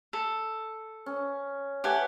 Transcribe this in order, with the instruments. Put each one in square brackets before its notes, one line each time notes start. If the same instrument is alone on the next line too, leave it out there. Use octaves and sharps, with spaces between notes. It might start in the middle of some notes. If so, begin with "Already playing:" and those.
[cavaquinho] A4
[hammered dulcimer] C#4
[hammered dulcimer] A3 B4 F#5 [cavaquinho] G4 G#5